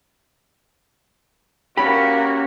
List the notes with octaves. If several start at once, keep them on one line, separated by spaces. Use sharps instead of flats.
A#3 C#4 F#4 G4 B5